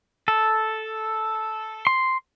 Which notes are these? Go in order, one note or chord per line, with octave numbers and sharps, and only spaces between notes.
A4
C6